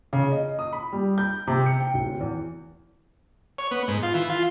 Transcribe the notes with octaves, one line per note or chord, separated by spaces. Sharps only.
C#3
D#5
D#6
B5
G3
G6
C3
C#7
G5
D1
E2
C#5
B3
G#2
F4
E3
F4